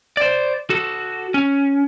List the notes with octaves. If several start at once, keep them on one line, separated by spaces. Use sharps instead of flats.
C5 D5
F#4 A4
C#4